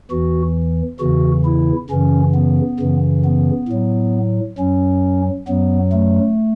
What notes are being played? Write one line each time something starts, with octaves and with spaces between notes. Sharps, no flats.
E2 E3 F#4
E2 C#3 E3 F#4
E4
F#2 C#3 E3 C#4
B3
F#2 C#3 E3
B3
A2 F#3
F#2 F#3 C#4
F#2 F#3 B3
A3